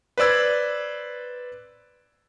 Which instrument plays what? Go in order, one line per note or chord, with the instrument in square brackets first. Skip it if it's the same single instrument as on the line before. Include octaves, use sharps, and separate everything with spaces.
[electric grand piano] B4 C5 D5 E6 G#6